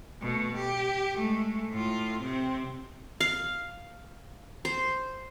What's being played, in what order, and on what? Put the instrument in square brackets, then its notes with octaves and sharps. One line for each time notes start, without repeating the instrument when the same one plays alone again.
[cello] B2 A3
G4
G#3 A3
A2 F4
C3 C4
[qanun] F5
C5